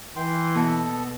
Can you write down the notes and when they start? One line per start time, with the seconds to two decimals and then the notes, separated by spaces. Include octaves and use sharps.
0.16 E3 G5 C6
0.55 B2 B3 A4